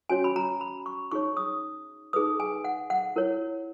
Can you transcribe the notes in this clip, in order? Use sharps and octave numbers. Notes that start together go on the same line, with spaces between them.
C#4 F#4 C#5 G#5
B5
A#5
B5
C#6
D#4 G#4 C#5 C#6
D#6
D#4 G#4 B4 D#6
G#5
F#5
F#5
E4 A#4 C#5